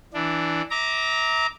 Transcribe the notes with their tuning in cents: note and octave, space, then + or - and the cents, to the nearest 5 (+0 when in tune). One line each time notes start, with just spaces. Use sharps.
E3 +0 D4 +0
E5 -35 A#5 +5 D6 +0